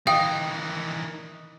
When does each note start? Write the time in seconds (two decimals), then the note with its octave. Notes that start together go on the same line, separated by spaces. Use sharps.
0.07 D#3 E3 D#5 F5 G5